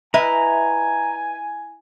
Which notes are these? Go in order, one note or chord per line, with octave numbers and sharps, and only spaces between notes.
E4 B4 D#5 E5 G#5 A#5